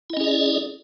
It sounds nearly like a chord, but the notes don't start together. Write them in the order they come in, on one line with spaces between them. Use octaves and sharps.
E4 D#5 C#4 G#4 D5